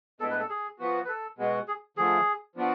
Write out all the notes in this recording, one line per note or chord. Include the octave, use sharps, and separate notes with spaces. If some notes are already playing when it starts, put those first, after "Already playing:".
A2 G#3 B3 D4 A4
B4
A4
G#4
F3 B3 F#4
B4
A4
B2 G#3 B3 F#4
G#4
D3 F3 A3 G#4
F3 B3 D4 F#4